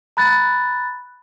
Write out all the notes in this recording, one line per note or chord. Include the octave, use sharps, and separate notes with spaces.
A#5 B5 F#6 A6